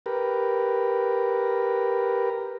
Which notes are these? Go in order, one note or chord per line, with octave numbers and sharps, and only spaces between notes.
G4 A#4 B4